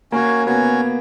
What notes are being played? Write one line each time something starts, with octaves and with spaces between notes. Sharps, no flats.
A#3 C#4 F#4 C#5
B3 C#4 F#4 C#5